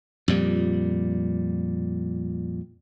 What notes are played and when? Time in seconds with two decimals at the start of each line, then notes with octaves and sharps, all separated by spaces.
0.28 F2 A#2 G3